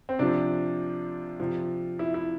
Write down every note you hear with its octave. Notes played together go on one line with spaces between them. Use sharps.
C4
C3 F3 D4
C3 F3
E4
E4